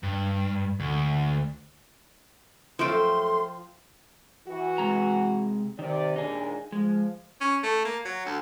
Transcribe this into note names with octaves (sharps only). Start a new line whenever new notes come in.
G2
D2
F#2 F3 A3 G5 C6
E3 F#4
C3 G#3 A#5
C3 D#3 D5
D#2 A#2 D4 D#4 G#4
F3 G#3
C#4
A3
A#3
F#3
D2